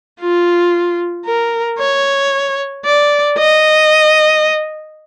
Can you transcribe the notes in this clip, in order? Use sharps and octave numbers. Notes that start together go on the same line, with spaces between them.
F4
A#4
C#5
D5
D#5